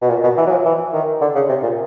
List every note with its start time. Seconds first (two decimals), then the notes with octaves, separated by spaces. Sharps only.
0.02 B2
0.10 A#2
0.23 B2
0.37 E3
0.47 F#3
0.52 F3
0.65 E3
0.93 D#3
1.21 D3
1.35 C#3
1.49 C3
1.63 A#2